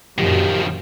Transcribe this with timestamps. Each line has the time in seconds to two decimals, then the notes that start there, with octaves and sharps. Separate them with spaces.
0.18 F#2 A#2 D#3 F3 G4